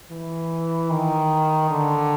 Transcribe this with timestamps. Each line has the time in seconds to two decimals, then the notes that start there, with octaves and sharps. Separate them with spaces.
0.10 E3
0.90 D#3
1.70 D3